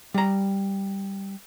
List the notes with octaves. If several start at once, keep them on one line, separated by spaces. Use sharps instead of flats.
G3 A#5